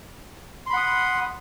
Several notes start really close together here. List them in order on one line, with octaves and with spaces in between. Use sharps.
C6 B5 F#5 D#6